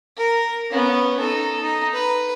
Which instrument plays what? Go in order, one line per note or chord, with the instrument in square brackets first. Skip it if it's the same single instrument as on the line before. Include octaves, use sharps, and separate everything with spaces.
[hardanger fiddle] A#4
B3 C#4
D#4 A4
D#4
B4